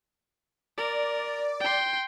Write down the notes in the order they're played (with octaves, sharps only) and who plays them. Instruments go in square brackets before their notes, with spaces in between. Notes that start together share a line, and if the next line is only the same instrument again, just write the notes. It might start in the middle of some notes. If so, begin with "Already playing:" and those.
[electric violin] A#4 [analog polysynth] D5
[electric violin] G5 C6